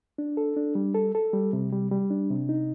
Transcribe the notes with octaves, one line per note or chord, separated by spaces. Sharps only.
D4
A4
D4
G3
A4
A4
G3
C3
G3
G3
D4
C3
D#4